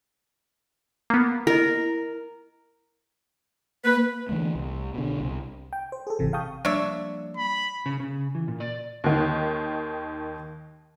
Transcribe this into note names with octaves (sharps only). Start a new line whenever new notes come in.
A#3 B3
E4 A#4 D#5
A#3 B4
D3 E3 A3 A#3
C2
B2 D3
C2
G5
C5
G#4 A4
G#1 C3 E3
F5 G5 A5 C#6 D#6 G6
F3 G3 A#3 D4 C#5 E5
B5
C#3
C#3
E3
A#2
D5
D#2 D#3